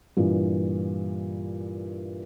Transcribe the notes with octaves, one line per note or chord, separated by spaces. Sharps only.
G2 A#2 E3